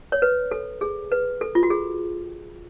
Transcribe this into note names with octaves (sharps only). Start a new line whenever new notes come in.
C#5
B4
A4
G#4
B4
A4
F4
F#4
G#4